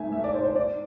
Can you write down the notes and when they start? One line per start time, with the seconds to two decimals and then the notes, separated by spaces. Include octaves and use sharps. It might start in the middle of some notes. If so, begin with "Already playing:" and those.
Already playing: G#2 A3 E5 G#5
0.12 A3 E5
0.24 D5
0.34 G#2 C5
0.44 C5
0.55 G#2 D5